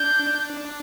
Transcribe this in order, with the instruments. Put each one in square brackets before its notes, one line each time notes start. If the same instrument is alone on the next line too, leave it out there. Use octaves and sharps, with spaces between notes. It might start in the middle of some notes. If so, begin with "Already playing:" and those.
Already playing: [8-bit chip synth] D4 [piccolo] G6